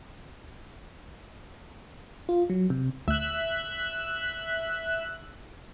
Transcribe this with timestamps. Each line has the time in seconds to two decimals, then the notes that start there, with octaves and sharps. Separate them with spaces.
2.29 F4
2.50 F#3
2.70 C3
3.08 D2 E5 F#6